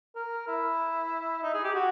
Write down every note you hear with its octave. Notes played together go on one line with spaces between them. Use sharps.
A#4
E4
D#4
G#4
G4
F#4